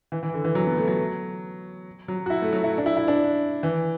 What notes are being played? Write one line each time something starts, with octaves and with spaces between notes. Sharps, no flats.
E3
E3
D3
E3
F#3
B3
A3
F#3
F#3
F#4
E4
A3
F#3
E4
D4
E4
E4
D4
E3